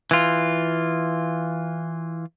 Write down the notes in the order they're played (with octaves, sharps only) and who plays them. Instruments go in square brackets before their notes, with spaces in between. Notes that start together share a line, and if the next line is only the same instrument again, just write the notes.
[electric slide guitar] E3 F4